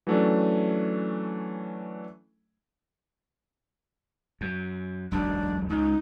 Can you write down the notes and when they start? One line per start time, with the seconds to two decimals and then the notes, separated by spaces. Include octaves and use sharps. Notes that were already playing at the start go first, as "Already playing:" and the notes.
0.07 E3 F#3 A3 C#4 D4
4.41 F#2
5.12 E1 B1 F#2 D4
5.70 C#2 D#4